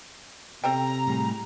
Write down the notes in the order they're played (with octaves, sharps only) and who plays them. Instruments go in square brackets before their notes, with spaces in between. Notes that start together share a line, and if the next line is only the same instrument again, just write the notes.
[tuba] C3 [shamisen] A4 C5 G5 [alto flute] A#5
[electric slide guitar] A2 G3 G#4